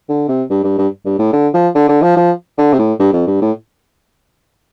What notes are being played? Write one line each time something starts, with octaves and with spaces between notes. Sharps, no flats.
D3
C3
G2
G2
G2
G2
A2
D3
F3
D3
D3
F3
F3
D3
C3
A2
G2
F2
G2
A2